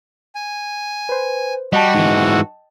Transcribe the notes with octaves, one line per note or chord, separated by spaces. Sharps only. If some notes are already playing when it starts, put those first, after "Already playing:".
G#5
B4 C5
G3 F#4 D#5 F#5 G5 A5
G#2 E3